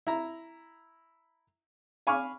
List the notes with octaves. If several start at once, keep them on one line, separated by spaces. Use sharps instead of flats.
E4 A#5
F5 G#5 B5 C#6 D6 F6